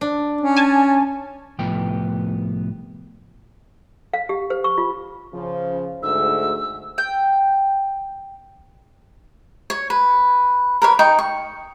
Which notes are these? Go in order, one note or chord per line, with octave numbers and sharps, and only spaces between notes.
D4
C#4
G#5 A5
C2 A2 F3 B3 G5
F5
G4
C5
C#6
F4
C#3 F3
D2 G#2 E6
G5
C#5
B4
A#4 B4 C#5
D#4 G5 C#6
C#6